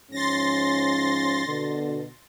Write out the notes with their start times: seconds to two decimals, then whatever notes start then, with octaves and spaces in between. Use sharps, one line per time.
0.12 G#2 F3 C#4 C6 A6 A#6
1.46 B2 D3